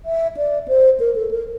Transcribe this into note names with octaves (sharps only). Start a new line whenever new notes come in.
E5
D5
C5
A#4
A4
A#4